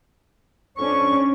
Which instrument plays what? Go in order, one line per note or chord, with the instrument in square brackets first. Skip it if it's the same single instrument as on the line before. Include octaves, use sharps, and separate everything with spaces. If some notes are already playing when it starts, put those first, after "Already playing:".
[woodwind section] F2 C#6 [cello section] C#4 D4